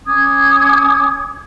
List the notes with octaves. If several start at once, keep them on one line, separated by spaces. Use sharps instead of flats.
C#4 D6 D#6 G#6